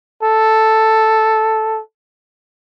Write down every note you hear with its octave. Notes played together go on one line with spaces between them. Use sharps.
A4